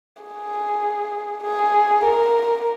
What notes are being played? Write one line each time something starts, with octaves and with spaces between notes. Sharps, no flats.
G#4
G#4
A#4